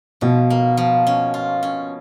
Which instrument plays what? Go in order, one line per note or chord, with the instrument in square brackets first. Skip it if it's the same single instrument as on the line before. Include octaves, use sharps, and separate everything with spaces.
[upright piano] B2 [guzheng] F3
[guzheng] A#3
F3
C#4
F4
C#4